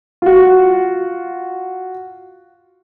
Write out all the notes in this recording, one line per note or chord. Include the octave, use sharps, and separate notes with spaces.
F4 F#4